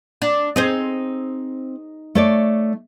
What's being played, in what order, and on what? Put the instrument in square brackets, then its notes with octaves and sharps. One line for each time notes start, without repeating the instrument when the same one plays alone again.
[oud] D4
[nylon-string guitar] C4 [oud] D#4 G#4 C5
[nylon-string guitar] A3 C#5 D5